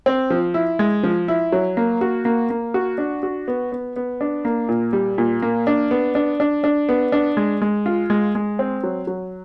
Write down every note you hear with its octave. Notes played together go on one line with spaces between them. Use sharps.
C4
F3
E4
G#3
F3
E4
F#3
A#3
F#4
A#3
A#3
F#4
D4
F#4
B3
B3
B3
D4
A#3
A#2
G3
A#2
A#3
D4
B3
D4
D4
D4
B3
D4
G#3
G#3
F4
G#3
G#3
C4
F#3
F#3